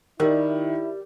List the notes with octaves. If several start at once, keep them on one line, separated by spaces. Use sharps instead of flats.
D#3 G3 E4 A#4